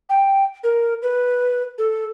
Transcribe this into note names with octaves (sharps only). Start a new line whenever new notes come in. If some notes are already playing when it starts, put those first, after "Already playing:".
G5
A#4
B4
A4